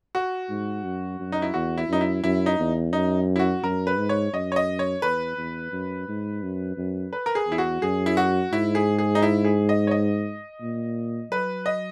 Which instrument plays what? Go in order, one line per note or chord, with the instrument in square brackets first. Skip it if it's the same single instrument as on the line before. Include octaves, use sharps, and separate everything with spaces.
[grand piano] F#4
[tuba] G#2
F#2
F#2
[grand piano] D#4
E4
[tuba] E2 [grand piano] F#4
[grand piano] E4
[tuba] F#2 [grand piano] D#4
[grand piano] E4
[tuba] F#2 [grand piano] E4
[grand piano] D#4
[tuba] E2
[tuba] F#2 [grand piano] D#4
[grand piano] E4
F#4
[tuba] F#2 [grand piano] A#4
[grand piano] B4
[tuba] G#2
[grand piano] C#5
[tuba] F#2 [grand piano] D#5
[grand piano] C#5
D#5
C#5
[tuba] E2 [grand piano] B4
[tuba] E2
F#2
G#2
F#2
F#2
[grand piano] B4
A#4
G#4
[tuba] E2 [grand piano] E4
[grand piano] F#4
[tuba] F#2 [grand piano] G#4
[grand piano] E4
F#4
[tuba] G#2 [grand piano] E4
[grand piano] G#4
G#4
D#4
E4
G#4
D#5
C#5
D#5
[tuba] A#2
[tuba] F#3 [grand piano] B4
[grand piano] D#5